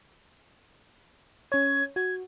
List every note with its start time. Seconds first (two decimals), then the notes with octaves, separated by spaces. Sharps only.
1.52 C#4 C#5 G#6
1.96 F#4 G#6